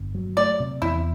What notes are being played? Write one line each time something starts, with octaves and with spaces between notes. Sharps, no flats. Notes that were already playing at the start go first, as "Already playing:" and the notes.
Already playing: G1
F#3
A3 D5
C3
E2 E4